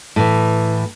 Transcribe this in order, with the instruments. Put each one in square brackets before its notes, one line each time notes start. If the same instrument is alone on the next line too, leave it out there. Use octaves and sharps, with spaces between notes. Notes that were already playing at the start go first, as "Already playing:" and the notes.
[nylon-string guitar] A2 E3